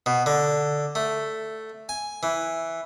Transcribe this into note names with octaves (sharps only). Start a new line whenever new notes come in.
B2
D3
A3
G#5
E3